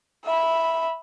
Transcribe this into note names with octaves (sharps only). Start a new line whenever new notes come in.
E5 B5